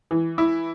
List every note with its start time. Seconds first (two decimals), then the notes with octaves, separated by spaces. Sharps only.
0.11 E3
0.38 E4